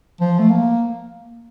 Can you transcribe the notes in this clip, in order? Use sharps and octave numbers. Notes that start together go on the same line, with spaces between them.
F3
A3
A#3